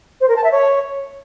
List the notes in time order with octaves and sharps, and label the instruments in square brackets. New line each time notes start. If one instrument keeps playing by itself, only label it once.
[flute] C5
A#4
A5
E5
C#5